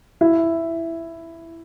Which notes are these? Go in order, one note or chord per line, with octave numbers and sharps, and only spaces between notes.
E4